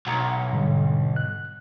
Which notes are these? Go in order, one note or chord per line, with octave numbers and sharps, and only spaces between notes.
B1 F#5 A#5 C#7
G#2 D3 G3
F#6